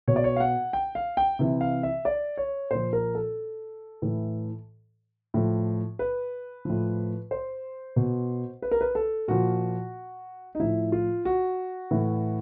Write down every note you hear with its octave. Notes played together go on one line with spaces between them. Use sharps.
B2 C#5
D5
C#5
F5
F#5
G5
F5
G5
C3 E3
F5
E5
D5
C#5
A#2 F3 C5
A#4
A4
A2 E3
A2 F3
B4
A2 F3
C5
B2
B4
A#4
B4
A4
A#2 F3 F#4
D#4
A2 F3 E4
F4
F#4
A2 E3